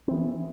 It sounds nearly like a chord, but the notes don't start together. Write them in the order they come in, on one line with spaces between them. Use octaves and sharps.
C4 E3 B3